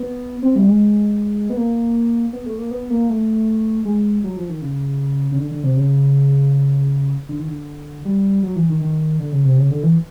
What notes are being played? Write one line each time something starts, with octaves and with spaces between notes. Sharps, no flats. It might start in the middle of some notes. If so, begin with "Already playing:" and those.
Already playing: B3
C4
G3
G#3
B3
A#3
B3
A3
A#3
B3
A#3
A3
G#3
F#3
F3
D#3
C#3
C#3
D3
D3
C3
C#3
D3
D#3
D3
G3
F#3
E3
D#3
D#3
D3
C#3
C3
C#3
D3
E3